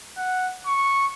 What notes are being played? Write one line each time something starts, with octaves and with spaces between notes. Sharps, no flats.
F#5
C#6